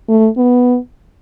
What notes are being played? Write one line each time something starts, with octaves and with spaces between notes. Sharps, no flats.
A3
B3